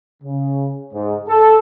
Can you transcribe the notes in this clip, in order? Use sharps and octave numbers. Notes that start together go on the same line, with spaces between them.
C#3
G#2
A4